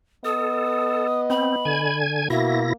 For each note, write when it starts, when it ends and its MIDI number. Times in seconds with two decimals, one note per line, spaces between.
0.25 1.84 59
0.25 1.07 69
0.25 1.97 75
0.25 1.22 87
1.30 1.56 60
1.30 1.97 83
1.65 2.28 50
1.65 2.28 80
1.65 2.28 92
2.30 2.73 47
2.30 2.73 58
2.30 2.73 64
2.30 2.65 66
2.30 2.58 76
2.30 2.73 94